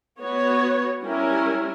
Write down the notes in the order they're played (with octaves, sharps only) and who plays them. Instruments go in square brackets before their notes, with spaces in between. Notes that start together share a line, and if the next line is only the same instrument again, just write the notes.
[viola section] B3 F#4 C#5
G3 C#4 E4 A#4